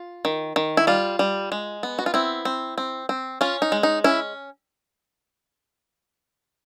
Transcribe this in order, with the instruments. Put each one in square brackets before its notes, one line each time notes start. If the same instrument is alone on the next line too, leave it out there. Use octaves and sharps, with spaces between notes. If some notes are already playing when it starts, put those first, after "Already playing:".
Already playing: [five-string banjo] F4
D#3
D#3
E4
G3 F4
G3
G#3
B3
F#4
F4
C4 E4
C4
C4
C4
C#4 F4
D#4
G#3
D#4
C#4 E4